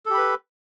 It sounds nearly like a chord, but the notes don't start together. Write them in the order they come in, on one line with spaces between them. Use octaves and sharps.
A4 G4 B5 B4